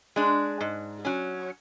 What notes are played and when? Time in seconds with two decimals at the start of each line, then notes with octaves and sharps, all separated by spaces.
0.16 G#3 D4
0.61 G#2
1.05 F#3 C#4